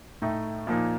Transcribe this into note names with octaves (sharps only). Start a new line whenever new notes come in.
A2 A3 D#4
A#2 F3 A#3 D#4